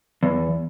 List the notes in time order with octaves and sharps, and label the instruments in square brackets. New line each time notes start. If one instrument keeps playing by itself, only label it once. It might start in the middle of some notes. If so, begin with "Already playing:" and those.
[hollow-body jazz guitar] E2